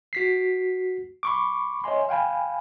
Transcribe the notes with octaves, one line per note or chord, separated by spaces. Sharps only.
F#4 B6 C7
B5 C#6 D6
C#5 D#5 E5 G#5 C6
F5 G5 G#5 B5